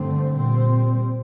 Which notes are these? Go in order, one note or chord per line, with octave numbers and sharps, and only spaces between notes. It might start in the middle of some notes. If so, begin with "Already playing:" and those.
Already playing: G2 D3 A3 C4
A#2 G3 C4